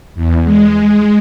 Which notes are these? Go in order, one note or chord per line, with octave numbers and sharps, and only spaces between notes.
E2
G#3